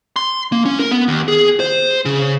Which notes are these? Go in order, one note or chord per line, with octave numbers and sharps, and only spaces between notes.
C6
A#3
C#4
A#4
B3
D#2
G#4
C5
C#3